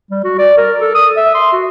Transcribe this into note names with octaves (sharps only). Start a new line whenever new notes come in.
G3
F#4
D5
A#4
A4
D#6
E5
C6
F#4